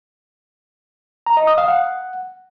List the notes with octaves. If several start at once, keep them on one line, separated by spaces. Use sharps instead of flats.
A#5
D#5
D#6
F5
F#5